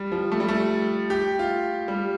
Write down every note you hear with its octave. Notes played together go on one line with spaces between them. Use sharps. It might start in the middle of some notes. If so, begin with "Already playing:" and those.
Already playing: G3
F3
A3
G3
A3
G4
F4
G3